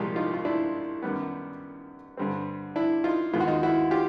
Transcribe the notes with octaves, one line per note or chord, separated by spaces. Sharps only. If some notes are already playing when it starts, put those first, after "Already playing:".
Already playing: C2 A#2 F3 G#3 F4 G4
D#4 F4
F4
D4 E4
F#2 D#3 G3 B3
G2 D3 G3 C4
D4 E4
D#4 F4
D#2 D#3 G#3 B3 F4
F#4
D#4 F4
E4 F#4
F4 G4